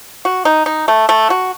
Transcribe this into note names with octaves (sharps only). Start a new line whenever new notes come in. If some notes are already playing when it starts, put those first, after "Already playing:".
F#4
D#4
D#4
A3
A3
F#4